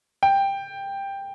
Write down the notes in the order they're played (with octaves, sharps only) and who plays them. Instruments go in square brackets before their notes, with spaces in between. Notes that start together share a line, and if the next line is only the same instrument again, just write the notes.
[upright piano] G5